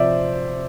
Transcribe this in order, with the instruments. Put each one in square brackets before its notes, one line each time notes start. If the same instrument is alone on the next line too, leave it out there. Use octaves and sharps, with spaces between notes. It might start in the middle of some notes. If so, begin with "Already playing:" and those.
Already playing: [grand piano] C3 F3 C5 D5 E5